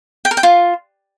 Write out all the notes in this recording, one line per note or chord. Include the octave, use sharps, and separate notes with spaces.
G5
A#4
G5
F4